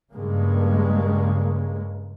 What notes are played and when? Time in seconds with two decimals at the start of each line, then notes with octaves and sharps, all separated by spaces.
0.12 G2 C#3 G#3 A#3